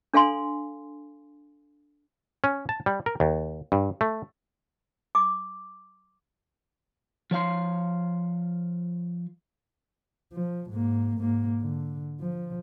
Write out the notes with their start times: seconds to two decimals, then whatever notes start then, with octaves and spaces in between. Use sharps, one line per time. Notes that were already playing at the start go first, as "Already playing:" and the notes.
0.14 D4 A4 F5 G#5 C6
2.44 C#4
2.69 A5
2.86 G3
3.06 A#4
3.20 D#2
3.72 G2
4.01 A3
5.15 D6
7.31 F3 C#5 F5 C6
10.33 F3
10.70 G#2 A#3
11.17 G#2 A#3
11.61 D3
12.20 F3